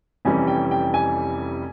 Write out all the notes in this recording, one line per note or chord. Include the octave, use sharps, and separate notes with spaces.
F1 F2 E3 G3 C#4 G#5
G5
G5
G#5